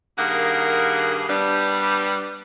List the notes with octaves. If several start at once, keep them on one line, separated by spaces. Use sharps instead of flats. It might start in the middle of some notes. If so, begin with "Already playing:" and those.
G2 D#3 A#3 G#4 A#4 F#5
G3 B3 D4